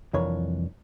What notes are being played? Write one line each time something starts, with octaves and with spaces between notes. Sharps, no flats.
C2 F2 E3 D4 A#4 C#5